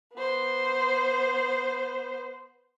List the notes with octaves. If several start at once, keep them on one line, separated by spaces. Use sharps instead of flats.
B3 C5